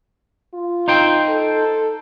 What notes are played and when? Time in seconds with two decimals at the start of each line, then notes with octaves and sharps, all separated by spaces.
0.54 F4
0.88 D#4 C5 G5
1.28 A4